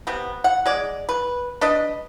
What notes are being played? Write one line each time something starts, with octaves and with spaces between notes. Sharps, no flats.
C3 B3
F#5
G#3 D5
B4
D4 B4 D#5